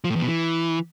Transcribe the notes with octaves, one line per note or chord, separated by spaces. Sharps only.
F3
A2
E2
B2
E3